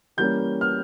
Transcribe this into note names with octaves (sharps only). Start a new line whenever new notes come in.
E3 G3 A#3 C#4 G6
F6